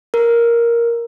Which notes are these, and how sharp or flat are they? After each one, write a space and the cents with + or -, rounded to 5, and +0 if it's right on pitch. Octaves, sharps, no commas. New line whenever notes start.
A#4 +5